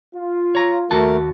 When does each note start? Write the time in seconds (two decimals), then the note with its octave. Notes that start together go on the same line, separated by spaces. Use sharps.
0.16 F4
0.55 C#5 A#5
0.91 D#2 A3 F#4 A#4 A5